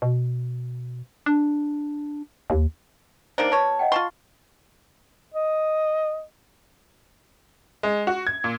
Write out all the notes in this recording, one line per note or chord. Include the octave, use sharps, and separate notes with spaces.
B2
D4
D#2
D#3 A#3 D4 C5 D7
B2 C#5 A5
D#5 F#5 G5
F4 A5 C6 C#6
D#5
G#3
F#4
G#6
A#2